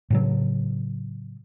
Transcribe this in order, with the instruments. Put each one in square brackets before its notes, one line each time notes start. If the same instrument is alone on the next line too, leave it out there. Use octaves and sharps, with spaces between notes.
[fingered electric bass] A2 C#3 F#3